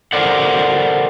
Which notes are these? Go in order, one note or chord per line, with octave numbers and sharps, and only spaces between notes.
A4 A#4 C5 D5 F#5